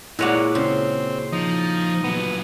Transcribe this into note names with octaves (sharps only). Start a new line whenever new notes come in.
A#2 G#3 E4 F#4 C#5 D5
C#3 C4
F3 D#4
A#2 F#3 B3